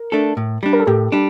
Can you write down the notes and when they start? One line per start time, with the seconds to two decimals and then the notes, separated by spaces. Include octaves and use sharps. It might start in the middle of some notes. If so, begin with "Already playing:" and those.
Already playing: A#4
0.12 A3 D4 A4
0.37 A2
0.63 G3 D4
0.73 A#4
0.80 A4
0.87 A2 G4
1.12 G3 D4